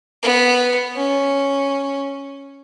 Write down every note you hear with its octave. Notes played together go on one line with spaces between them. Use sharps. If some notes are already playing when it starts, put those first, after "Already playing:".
B3
C#4